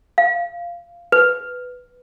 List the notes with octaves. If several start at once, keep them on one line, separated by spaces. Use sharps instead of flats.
F5
B4